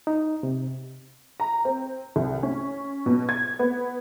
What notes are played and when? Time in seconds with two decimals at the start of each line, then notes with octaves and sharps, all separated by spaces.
0.07 D#4
0.43 C3
1.40 A#5
1.65 C4
2.16 C2
2.43 C#4
3.06 B2
3.29 G#6
3.59 B3